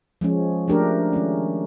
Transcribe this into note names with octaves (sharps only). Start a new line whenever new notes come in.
F3 G#3 C#4
F3 A3 D4 G4 A#4
D#3 G#3 C#4